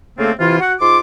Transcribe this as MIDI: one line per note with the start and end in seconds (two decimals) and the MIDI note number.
0.18 0.31 49
0.18 0.31 57
0.18 0.31 58
0.18 0.31 60
0.18 0.31 65
0.18 0.31 69
0.39 0.59 48
0.39 0.59 52
0.39 0.59 64
0.39 0.59 65
0.60 0.73 66
0.60 0.73 78
0.80 0.99 44
0.80 0.99 65
0.80 0.99 84
0.80 0.99 86